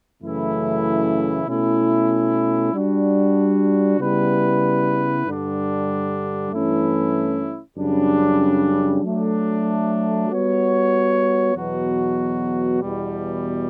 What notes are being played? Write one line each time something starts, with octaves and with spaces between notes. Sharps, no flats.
F#2 C#3 E3 A3 E4
B2 A3 C#4 E4
G3 D4 F#4
C#3 G3 B3 E4 B4
G2 D3 G3 D4
G2 E3 A3 C#4 E4
F#2 C#3 G3 D4
F#3 A3 D4
G3 B3 F#4 C#5
E2 B2 F#3 B3 F#4
E2 B2 G3